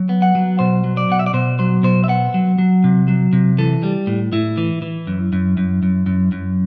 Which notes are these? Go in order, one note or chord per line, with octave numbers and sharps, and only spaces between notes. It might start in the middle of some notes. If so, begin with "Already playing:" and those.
Already playing: F#3
B3
F#5
F#3
B2 C5
F#3
D5
B2 F#5
E5
D5
B2 C5
F#3 C5
B2 C5
E5
B3 F#5
F#3
F#3
C3
F#3
C3
E3 A4
G3
A2
A2 E4
E3
E3
F#2
F#2
F#2
F#2
F#2
F#2